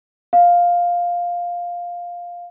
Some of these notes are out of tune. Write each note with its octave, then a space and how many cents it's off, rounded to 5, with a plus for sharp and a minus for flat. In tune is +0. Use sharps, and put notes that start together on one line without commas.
F5 +5